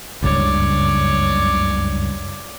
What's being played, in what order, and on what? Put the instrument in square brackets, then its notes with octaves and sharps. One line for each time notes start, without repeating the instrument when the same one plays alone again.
[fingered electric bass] F#1 C#2 G2 [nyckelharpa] C#5 D5